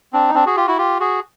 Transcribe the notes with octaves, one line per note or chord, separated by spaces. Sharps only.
C4 D4
D#4
C4 D4
F#4 G#4
F4 G4
E4 F#4
F4 G4
F#4 G#4